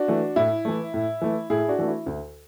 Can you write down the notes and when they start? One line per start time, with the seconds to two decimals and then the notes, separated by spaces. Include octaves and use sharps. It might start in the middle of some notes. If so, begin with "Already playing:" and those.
Already playing: D4 F#4
0.08 E3 A3
0.36 A2 E4
0.65 E3 A3
0.94 A2
1.21 E3 A3
1.50 A2 E4 G#4
1.68 D4 F#4
1.79 E3 A3
1.87 E4
2.06 D2